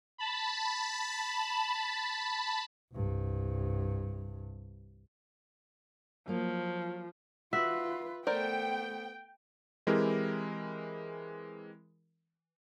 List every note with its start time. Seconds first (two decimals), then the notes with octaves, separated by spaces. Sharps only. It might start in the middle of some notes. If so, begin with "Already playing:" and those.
0.18 A5 B5
2.93 C2 G2
6.28 F3 F#3 A#3
7.53 F4 F#4 B4 E5
8.27 A3 B3 A#4 C5 D5 G5
9.87 E3 G#3 C4 E4 G4 A#4